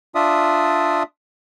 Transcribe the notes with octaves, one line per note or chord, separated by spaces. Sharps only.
D4 F4 D5 E5 D#6